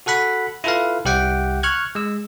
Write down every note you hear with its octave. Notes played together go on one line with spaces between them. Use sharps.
F#4 A4 F#5 B5
E4 F4 A4 B4 F5
C2 G4 E5 F#5 G5 D6
C#6 F6 F#6 G#6
G#3 E6